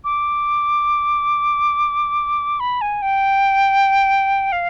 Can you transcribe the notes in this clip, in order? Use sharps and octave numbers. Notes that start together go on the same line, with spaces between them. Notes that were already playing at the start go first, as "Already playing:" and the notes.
D6
B5
G#5
G5
F5